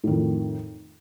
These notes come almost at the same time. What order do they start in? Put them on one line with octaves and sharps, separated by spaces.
A2 D#3 F2